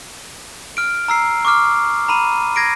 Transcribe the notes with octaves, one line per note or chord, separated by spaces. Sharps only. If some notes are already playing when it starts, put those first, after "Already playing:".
F6 D7
A#5 E6 C7
C#6 D6 F6
A#5 B5 D#7
G#6 A#6 C7 D7